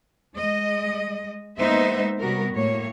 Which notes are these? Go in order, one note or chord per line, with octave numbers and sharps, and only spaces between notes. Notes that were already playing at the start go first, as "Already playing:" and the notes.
G#3 D#5
G#3 A#3 B3 D#4 C5 E5
C3 G3 B3 F#4 A#4
A2 A#3 C#5